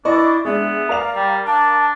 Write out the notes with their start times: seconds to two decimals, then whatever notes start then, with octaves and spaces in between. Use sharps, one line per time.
0.05 D4 E4 D5 D#5 C#6
0.45 G#3 B3 D4 E5
0.89 A#4 D5 F5 F7
1.15 G3
1.47 D4 A5